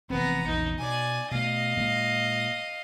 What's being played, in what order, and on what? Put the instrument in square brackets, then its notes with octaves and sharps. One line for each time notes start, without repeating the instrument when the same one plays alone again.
[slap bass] F1 E3 C4 [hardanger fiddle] B3 A#5
[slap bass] A#1 E2 C#3 [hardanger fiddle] D#4
[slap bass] B2 [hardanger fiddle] D5 G#5
[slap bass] B2 A3 [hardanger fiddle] D#5 F5
[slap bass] A#2 G#3 A#3